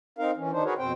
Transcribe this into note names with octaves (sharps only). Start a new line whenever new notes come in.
C4 D#4 A#4 F5
E3 C#4
D#3 D4 D#4 C5
F#4 G#4 A#4 B4 C#5
F2 B2 C4 C5 G5